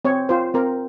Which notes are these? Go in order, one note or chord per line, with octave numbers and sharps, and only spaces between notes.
C4 C#5
F4 C5
C4 A#4